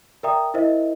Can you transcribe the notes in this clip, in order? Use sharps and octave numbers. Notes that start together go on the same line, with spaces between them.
A#4 D5 E5 G5 A#5 D#6
E4 A#4 C5 D#5 E5